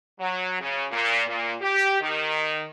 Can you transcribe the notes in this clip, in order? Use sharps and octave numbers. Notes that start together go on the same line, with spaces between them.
F#3
C#3
A#2
A#2
G4
D#3